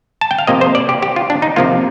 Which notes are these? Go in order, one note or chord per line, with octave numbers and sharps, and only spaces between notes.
A5
G5
F5
C3 F3 A#3 D#5
C5
D5
G4
G4
F4
D4
D#4
C3 F3 A#3 F4